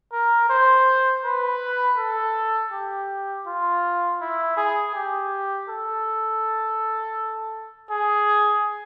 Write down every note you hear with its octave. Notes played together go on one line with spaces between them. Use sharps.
A#4
C5
B4
A4
G4
F4
E4
G#4
G4
A4
G#4